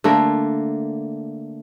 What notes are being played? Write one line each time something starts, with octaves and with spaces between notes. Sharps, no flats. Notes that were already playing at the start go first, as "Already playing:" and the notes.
D3 A3 A#3